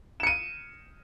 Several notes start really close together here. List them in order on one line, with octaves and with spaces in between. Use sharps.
E7 C#7 D#7